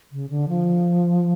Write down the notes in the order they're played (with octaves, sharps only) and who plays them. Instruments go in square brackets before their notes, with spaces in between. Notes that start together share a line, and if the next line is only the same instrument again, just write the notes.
[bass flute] C#3
D3
F3